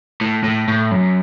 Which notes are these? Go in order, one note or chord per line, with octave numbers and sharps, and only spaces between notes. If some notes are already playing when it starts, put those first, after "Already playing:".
A2
A2
A2
F#2